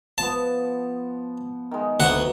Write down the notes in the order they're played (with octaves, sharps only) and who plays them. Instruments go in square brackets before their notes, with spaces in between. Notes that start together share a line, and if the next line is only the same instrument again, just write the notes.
[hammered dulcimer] F3 B3 [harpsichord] A5
[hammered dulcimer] D#3 G#3
[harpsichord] D2 F#5 [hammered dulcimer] A2 F#3 B3